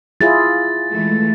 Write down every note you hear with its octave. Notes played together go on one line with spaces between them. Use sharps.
E4 F4 G#4 A6
E3 G#3 A3